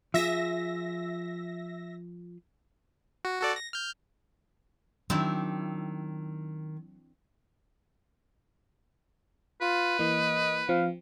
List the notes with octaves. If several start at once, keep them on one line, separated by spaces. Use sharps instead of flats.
F3 F4 G#4 E5 A#6
F#4
F#4 A4 D5
A#6
F6 G6
D#3 F#3 C4 D4 E4
F4 B4
E3 A#3 D#5
F3 C4 F5